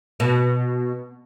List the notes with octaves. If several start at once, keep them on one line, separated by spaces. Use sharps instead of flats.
B2